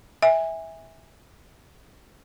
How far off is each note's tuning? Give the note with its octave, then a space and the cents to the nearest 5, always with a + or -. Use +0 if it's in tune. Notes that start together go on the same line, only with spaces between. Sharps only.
E5 -15 G#5 -25